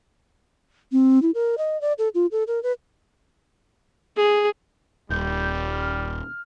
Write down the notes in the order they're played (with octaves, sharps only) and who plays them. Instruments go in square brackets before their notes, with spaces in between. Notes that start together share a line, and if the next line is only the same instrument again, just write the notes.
[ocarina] C4
E4
A#4
D#5
D5
A4
F4
A4
A#4
B4
[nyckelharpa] G#4
[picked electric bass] D#1 [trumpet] G3 [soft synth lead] G6
[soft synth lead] F6